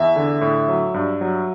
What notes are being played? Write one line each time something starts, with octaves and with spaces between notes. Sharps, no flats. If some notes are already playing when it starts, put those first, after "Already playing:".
Already playing: E2 E5
D3
A2
F#3
G2
F#3